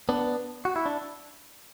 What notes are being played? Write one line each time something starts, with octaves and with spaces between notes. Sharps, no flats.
B3 D4
F#4
E4
D4